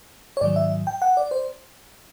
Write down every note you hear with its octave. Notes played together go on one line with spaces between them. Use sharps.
C#5
G#2 D#3 F#3 D5
E5
G5
F#5
D5
C5